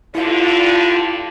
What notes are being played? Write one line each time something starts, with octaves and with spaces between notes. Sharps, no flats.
G2 D3 E4 F4 F5